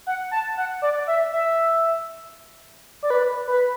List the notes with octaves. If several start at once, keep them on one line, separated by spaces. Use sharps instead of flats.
F#5
A5
F#5
D5
E5
E5
D5
B4
B4